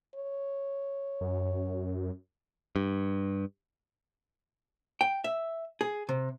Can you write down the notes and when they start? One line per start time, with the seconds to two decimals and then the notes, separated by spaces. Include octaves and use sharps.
0.15 C#5
1.21 F#2
2.76 G2
5.01 G5
5.24 E5
5.81 G#4
6.09 C3